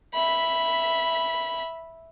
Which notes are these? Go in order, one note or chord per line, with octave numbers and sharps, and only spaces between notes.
E5 B5